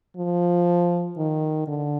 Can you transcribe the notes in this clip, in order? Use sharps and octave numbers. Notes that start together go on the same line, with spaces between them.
F3
D#3
D3